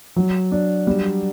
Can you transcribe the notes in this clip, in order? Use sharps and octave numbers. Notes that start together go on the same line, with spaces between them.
F#3
D4
G3